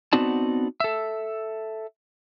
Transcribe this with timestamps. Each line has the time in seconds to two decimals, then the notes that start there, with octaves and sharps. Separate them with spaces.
0.13 B3 C4 D#4 F#4 D5 A5
0.80 A4 E5